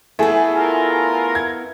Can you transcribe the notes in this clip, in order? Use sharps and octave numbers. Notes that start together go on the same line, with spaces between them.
A3 B3 E4 G#4
F4 A#4
G#6